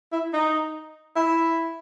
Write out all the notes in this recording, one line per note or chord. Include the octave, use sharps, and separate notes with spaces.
E4
D#4
E4